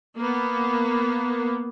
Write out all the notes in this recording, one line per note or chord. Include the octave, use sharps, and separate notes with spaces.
A#3 B3